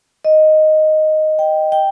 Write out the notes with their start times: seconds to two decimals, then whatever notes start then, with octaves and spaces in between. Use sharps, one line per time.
0.24 D#5
1.39 G5
1.72 G5